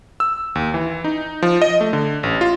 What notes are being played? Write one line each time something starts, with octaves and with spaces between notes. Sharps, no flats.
E6
D#2
E3
D#4
F3
D#5
A3
D3
A1
F4